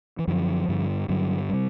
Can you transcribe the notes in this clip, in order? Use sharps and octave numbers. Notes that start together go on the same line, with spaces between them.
E3
F#2 D3 F3
G2 D3
G2 D3 F#3
C3 G3